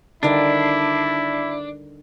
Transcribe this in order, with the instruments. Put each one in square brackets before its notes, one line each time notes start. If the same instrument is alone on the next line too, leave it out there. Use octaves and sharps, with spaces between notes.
[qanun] D3 D#3 G3 [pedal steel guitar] D4 [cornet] E4